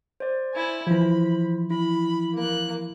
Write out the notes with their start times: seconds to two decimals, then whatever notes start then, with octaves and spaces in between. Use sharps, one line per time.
0.20 C5 D5
0.53 E4 G#5
0.87 E3 F3 E4 C5 B5
1.70 E4 B5
2.34 A#3 F#6